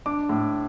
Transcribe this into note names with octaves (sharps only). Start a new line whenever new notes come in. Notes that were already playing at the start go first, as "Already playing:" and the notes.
D4 D6
A2